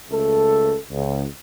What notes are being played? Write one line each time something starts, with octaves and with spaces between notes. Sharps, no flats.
C#2 A3 A4
C#2